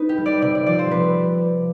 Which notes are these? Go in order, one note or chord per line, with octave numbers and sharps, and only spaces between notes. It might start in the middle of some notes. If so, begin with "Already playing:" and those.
Already playing: D#4 B4
G4
G3
D5
C3 D5
D5
F3 D5
C5
C3 B4